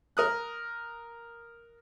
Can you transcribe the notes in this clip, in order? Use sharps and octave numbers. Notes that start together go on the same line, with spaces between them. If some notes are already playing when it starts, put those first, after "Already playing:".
A#4 D#6 F#6